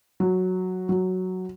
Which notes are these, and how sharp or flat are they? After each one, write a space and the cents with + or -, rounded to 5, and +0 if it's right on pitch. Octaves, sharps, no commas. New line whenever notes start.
F#3 -5
F#3 +0